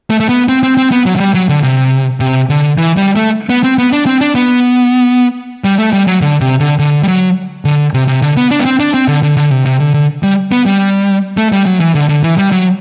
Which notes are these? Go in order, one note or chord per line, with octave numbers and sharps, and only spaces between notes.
A3
A3
B3
C4
C4
C4
B3
F#3
F#3
G3
F#3
D3
C3
C3
D3
E3
G3
A3
B3
C4
B3
D4
C4
D4
B3
G3
A3
G3
F#3
D3
C3
D3
D3
G3
F#3
D3
C3
C3
D3
B3
D4
B3
C4
D4
C4
D3
D3
D3
C3
C3
D3
D3
G3
B3
G3
A3
G3
F#3
E3
D3
D3
E3
G3
F#3